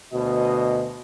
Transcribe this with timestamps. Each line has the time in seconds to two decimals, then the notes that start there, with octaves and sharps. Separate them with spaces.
0.13 D2 B2 F#4 D#5